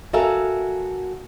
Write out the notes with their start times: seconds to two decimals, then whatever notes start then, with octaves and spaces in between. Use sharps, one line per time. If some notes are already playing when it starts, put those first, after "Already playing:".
0.13 F#4 A4 A#4 E5 F5 G#5